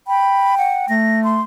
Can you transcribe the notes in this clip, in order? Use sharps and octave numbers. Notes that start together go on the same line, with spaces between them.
G5 B5
F#5
A3 A#6
C6